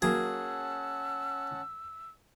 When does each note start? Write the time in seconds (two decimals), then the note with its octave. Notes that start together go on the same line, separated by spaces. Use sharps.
0.02 F#3 A#3 C#4 G#4 F#5 A5 E6